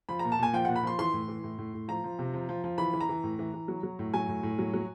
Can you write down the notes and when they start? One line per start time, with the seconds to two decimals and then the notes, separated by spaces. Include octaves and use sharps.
0.09 F3 B5
0.19 A#2 A#5
0.32 A5
0.39 A#2 G#5
0.53 F3 G5
0.65 A#2 F#5
0.76 B5
0.83 F3 C6
0.98 E3 C6
1.13 A2
1.28 E3
1.44 A2
1.58 A2
1.74 A2
1.88 F3 A#5
2.04 F3
2.19 C3
2.34 F3
2.49 F3
2.64 F3
2.78 E3 B5
2.93 E3
3.01 A#5
3.09 E3
3.23 A2
3.39 E3
3.54 E3
3.68 F#3
3.83 F#3
3.99 A2
4.14 F#3 G#5
4.29 A2
4.43 A2
4.59 F#3
4.73 F#3